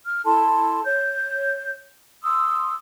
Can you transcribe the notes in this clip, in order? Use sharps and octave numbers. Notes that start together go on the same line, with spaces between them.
F6
E4 A4 A5 C6
C#5 G6
C6 D#6 E6